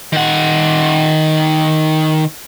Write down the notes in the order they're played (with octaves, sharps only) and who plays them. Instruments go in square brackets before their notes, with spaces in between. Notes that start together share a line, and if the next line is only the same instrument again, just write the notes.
[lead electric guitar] D#3 F#5